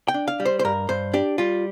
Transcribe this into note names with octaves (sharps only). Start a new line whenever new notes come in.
G5
D4
F5
G3
C5
C5
G2 A#4
G2 C5
D4 G4
G3 F4